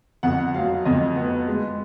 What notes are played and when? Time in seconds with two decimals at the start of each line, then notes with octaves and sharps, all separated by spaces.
0.23 F2 F#5
0.54 F#3 F5
0.85 F2 D#5
1.16 B3
1.47 G#3